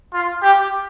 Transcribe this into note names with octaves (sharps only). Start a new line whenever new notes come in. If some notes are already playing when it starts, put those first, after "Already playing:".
F4
G4